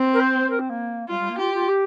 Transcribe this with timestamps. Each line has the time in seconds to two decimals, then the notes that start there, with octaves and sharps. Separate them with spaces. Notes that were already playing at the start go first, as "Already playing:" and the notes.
Already playing: C4
0.13 A#4
0.20 C5
0.50 A#4
0.59 C4
0.69 A#3
1.08 G3 F4
1.19 G3
1.29 A#3
1.39 F4 G4
1.54 F4
1.68 G4